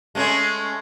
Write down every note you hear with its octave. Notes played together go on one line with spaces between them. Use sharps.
G#3 A3 C#4